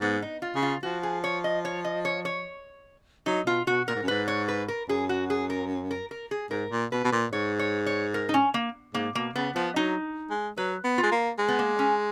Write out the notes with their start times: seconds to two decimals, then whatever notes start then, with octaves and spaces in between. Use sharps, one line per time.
0.01 G#2 B3
0.22 D#4
0.42 F4
0.55 C#3
0.63 F4
0.83 F3 F#4
1.03 G#4
1.24 C#5
1.44 D#5
1.65 C#5
1.85 D#5
2.05 C#5
2.25 C#5
3.26 F#3 D#4
3.46 B2 F4
3.67 B2 F#4
3.88 A#2 A#4
3.95 G#2
4.03 F#2
4.08 G#2 B4
4.28 C#5
4.48 B4
4.68 A#4
4.89 F#2 G#4
5.09 F#4
5.30 G#4
5.50 A#4
5.91 A#4
6.11 A#4
6.31 G#4
6.51 G#2 A#4
6.71 A#2
6.92 B2 B4
7.04 B2
7.12 A#2
7.32 G#2 C#5
7.59 C#5
7.86 C#5
8.14 A#4
8.29 D#4
8.34 C#4
8.54 A#3
8.94 G#2 A#3
9.15 B2 A#3
9.35 C#3 B3
9.55 F3 B3
9.76 F#3 D#4
10.30 G#3
10.57 F#3 B4
10.84 B3
10.98 F4
11.03 G#3
11.12 A#3
11.38 G#3
11.48 B3
11.59 A#3
11.79 C#4